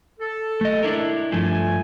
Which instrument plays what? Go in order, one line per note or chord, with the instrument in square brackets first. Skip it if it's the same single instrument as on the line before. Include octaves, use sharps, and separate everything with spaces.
[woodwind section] A4
[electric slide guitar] A3 D#5
D4 E4 A#4
[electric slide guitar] G2 F3 A3 [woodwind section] G#5